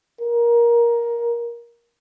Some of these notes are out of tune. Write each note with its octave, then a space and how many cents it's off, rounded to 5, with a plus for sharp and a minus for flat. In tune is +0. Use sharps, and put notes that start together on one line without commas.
A#4 +15